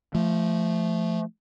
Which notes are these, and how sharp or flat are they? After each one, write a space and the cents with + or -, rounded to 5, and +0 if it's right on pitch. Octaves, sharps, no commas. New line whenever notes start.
F3 -20 A3 +0